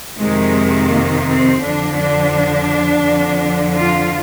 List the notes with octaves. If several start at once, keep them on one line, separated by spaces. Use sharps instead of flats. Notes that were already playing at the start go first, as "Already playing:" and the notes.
F2 C3 D#3 G#3
A#3
C4
F2 D3 F3 D4
D4
F2 D3 F3
F4